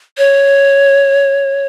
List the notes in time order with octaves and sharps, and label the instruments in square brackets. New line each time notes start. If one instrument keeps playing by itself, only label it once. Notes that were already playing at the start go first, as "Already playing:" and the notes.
[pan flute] C#5